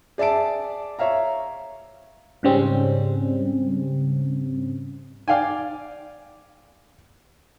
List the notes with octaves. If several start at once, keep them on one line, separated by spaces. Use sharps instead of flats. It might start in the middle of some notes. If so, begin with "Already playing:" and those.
G#4 D5 E5 A5 D7
C#5 E5 F5 A#5
G#2 C#3 G3 C4 C#4
D5 F5 G5 G#5